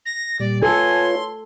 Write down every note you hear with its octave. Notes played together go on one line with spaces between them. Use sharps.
A#6
A#2 G3 D5
F4 A4 B4 C#5 G#5 C6